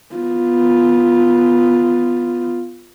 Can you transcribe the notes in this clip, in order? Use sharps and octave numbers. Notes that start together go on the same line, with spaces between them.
B3 F4